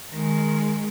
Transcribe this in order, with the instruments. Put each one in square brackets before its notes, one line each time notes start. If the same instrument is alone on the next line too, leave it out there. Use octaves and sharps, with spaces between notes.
[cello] D#3 G#3